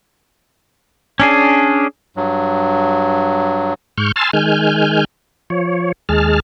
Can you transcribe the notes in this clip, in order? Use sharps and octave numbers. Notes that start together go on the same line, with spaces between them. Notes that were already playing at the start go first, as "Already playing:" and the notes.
C#4 D4 G#4
G2 F#3
G#2 C#6 F6 G6
G#5 A5 C6 E6 F6 A6
D#3 G#3 G#5 F6 G6
F3 C#5
D#2 G#3 G#4 A5 F6